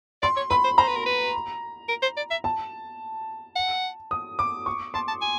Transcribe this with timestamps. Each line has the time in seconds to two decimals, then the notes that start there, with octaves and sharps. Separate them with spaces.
0.23 D5 C6
0.37 C#5
0.50 B4 B5
0.64 C5
0.78 C5 A#5
0.88 B4
0.96 A#4
1.06 B4
1.89 A#4
2.02 C5
2.17 D5
2.31 E5
2.44 A5
3.56 F#5
4.11 D#6
4.39 D6
4.66 C#6
4.94 A5 C6
5.08 A5
5.22 G#5